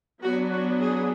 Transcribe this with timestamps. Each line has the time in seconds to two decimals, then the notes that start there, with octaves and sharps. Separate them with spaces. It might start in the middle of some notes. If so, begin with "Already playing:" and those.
0.22 F#3 B3 D4 F#4
0.52 F#4
0.81 G#4